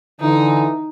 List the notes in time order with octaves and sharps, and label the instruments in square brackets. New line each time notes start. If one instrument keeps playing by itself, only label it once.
[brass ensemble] D3 E3 [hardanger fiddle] D#4